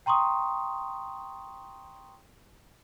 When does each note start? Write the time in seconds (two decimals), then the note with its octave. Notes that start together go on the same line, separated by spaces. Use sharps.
0.06 G5 A#5 C6 C#6 D#6